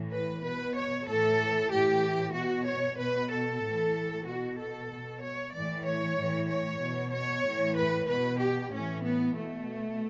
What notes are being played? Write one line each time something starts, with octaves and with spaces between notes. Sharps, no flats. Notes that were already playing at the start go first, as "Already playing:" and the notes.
Already playing: A2 E3
B4
B2 B4
C#5
A2 E3 A4
A2 E3 G4
B2 F#4
C#5
B2 B4
A4
A2 E3
B2 F#4
A4
B2
C#5
A2 E3 D5
C#5
A2 E3
C#5
B2
C#5
A2 E3
B4
B2 B4
G4
A2 E3 C#4
B3
B2 A3